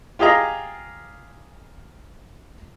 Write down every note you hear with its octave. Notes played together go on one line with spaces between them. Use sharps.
F4 G4 G#4 D#5 A#5